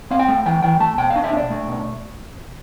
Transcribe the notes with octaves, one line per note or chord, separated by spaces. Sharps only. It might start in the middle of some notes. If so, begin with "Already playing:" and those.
C4 F5
G5
A3
E3 G5
E3 G5
A3 A5
B2 G5
F5
D4
E5
D4 D5
A3
B2